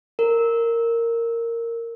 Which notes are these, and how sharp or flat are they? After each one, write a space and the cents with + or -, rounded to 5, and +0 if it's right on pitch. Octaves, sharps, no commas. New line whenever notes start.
A#4 -10